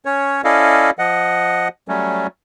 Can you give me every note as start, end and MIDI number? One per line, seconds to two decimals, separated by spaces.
0.05 0.41 61
0.05 0.41 73
0.44 0.90 61
0.44 0.90 64
0.44 0.90 69
0.44 0.90 74
0.44 0.90 75
0.44 0.90 77
0.99 1.68 53
0.99 1.68 75
0.99 1.68 78
1.88 2.27 54
1.88 2.27 55
1.88 2.27 57
1.88 2.27 61